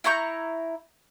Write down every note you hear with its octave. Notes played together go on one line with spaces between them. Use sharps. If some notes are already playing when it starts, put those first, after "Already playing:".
E4 A#5 C#6 G6